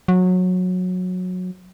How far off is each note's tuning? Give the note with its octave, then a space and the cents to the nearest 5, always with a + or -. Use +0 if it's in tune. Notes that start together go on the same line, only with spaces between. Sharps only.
F#3 -20